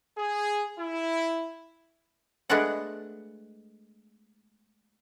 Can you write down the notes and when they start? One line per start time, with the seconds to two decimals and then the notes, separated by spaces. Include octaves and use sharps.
0.18 G#4
0.80 E4
2.50 G#3 A3 B3 D4 D5 F#5